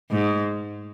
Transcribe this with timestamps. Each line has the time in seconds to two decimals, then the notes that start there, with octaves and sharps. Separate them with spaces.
0.11 G#2